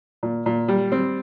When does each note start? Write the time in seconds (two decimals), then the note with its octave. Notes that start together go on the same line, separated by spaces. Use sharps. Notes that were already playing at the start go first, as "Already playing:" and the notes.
0.23 A#2
0.46 A#2
0.68 G3
0.92 C4